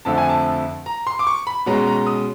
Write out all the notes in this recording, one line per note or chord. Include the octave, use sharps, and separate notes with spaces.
F2 D3 F3 A3 A5
G#5
A5
A#5
C6
D6
C#6
B5
B2 G#3 C#4 A#5
A#5
D#6